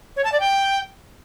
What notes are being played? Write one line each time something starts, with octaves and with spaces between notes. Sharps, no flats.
C#5
A5
D5
G5